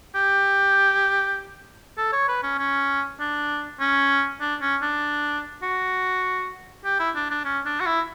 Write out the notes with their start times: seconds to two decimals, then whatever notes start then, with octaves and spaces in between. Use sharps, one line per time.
0.15 G4
1.98 A4
2.13 C#5
2.28 B4
2.43 C#4
2.58 C#4
3.20 D4
3.80 C#4
4.41 D4
4.61 C#4
4.82 D4
5.63 F#4
6.85 G4
6.99 E4
7.15 D4
7.30 D4
7.45 C#4
7.66 D4
7.80 F#4
7.86 E4